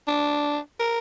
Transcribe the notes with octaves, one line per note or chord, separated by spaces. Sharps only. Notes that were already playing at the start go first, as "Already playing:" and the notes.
D4
A#4